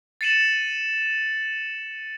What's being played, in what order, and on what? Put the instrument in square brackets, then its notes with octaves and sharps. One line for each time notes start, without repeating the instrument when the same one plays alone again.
[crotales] A6 C7 C#7 D#7 E7 F#7